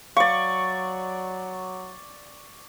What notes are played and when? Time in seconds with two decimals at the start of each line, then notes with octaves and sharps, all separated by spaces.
0.16 F#3 D5 F5 C#6